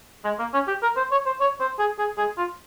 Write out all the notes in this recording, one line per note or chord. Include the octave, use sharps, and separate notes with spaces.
G#3
A#3
C#4
G4
A#4
C5
C#5
C5
C#5
C5
G#4
G#4
G#4
F4